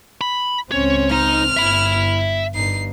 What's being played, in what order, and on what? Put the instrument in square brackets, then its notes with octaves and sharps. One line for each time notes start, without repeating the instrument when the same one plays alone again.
[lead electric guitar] B5
[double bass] C#2 C4 [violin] C#4 [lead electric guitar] C#5
[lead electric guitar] D#4 [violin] F6
[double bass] G1 [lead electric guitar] E5 B5
[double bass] G1 G2 [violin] D#4 C7